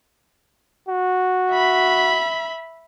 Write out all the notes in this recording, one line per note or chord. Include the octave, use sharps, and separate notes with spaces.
F#4
E5 B5